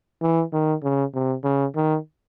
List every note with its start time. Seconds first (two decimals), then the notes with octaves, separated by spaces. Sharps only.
0.22 E3
0.53 D#3
0.83 C#3
1.14 C3
1.44 C#3
1.76 D#3